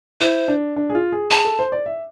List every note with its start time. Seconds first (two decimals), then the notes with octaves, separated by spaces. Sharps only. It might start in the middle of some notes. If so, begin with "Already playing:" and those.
0.20 E4 C5
0.48 D4
0.76 D4
0.90 G#4
0.95 F4
1.12 G#4
1.30 G#4 A5
1.45 A4
1.59 C5
1.72 D5
1.86 E5